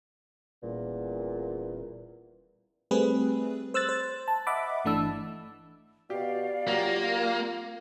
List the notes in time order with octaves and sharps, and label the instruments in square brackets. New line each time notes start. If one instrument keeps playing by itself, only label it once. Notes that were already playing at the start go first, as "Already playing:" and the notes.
[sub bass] D#1 [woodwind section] E2 A#2
[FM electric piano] G3 A3 C4 G#4 B4
C5 E6 F#6 A6
C5
A5
D#5 E5 F#5 B5 D6
G1 E3 A3 D4 A5 E6
[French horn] B2 [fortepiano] G4 [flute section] D5 F5
[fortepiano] F#3 G4 [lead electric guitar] A#3 [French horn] F4